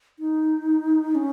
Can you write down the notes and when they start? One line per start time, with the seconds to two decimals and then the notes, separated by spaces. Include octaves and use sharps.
0.19 D#4
1.15 C#4